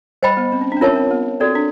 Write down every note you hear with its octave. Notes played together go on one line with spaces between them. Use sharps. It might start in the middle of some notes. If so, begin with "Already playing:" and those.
G3 C5 D#5 G5 B5
B3
C4
C#4
D4
C4
C#4 F4 A#4 C#5 E5 A5
C4
B3
C4 F#4 A4 D5
D4